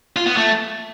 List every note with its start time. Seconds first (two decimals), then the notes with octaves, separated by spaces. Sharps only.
0.16 F4
0.26 B3
0.37 A3